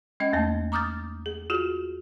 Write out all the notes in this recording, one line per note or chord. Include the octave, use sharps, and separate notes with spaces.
G#3 C#4 D#5 G5
E2 A3 A#3 A5
A#5 D6 D#6 F6 G6 A6
G#4
F4 F#4 G#4